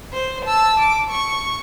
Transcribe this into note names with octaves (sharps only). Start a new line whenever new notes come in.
C5
A5 E6
D6
C#6